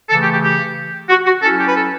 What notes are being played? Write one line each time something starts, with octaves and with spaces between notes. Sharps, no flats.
C#3 E3 A3 A4
G4
G4
G4
F#4
F#4
F#3 C#4 E4 A4
G4
B4
A4